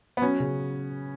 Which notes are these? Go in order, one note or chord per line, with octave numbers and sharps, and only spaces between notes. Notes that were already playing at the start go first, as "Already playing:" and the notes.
B3
F#3 C#4
C#3